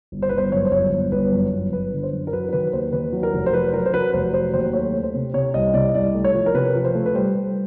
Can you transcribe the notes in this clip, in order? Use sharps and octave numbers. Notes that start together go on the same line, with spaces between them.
G1
C5
B4
G1
C5
F#2 C#5
C5
G1 C#5
G1
G1 B4
F#2
G1
G1 B4
D3
C5
F#2
A#4
F#3 B4
A#4
D#3 B4
D#2 C5
D#3 B4
F#3
A#4
F1
C5
F#3 B4
F#3 A#4
C5
F#3 B4
F1 C5
F#3 C5
D#2 C5
A3 C#5
A3
C5
C3
C3 C#5
C2 D#5
C3 D5
D#5
C2 D5
A3
C#5
F3
A#4
C3 B4
F3
C5
A3
B4
G3 C5
G3